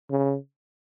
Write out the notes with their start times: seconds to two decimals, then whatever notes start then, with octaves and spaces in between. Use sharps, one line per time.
0.11 C#3